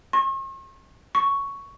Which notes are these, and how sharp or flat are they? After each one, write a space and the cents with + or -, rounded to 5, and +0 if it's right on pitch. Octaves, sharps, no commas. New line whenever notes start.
C#6 -45
C#6 +5